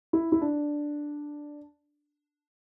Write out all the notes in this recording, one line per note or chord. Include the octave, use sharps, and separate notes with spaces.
E4
E4
D4